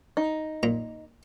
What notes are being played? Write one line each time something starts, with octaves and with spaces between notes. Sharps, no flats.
D#4
A#2 A#5